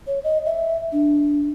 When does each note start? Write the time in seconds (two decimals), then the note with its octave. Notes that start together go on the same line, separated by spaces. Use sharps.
0.07 C#5
0.24 D#5
0.46 E5
0.92 D4